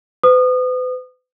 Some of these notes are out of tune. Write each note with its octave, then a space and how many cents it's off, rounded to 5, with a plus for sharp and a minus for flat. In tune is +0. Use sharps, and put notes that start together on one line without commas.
B4 +40 D#6 -30